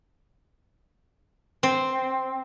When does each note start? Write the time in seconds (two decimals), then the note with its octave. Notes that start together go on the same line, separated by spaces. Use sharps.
1.63 C4